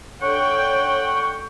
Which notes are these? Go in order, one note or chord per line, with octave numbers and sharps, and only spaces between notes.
D3 C#5 F#5 G5 C#6